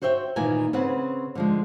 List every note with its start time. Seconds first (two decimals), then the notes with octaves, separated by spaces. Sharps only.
0.02 F#4 C5 C#5 E5 G5
0.36 A#2 D#3 E3 G#5
0.73 C#3 C4 B4 F#5
1.35 D3 F3 G#3